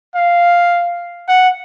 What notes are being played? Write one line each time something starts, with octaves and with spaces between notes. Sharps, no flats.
F5
F#5